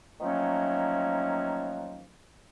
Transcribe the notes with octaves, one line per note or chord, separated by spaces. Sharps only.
D#3 F3 F#3 A3 A#3 C#4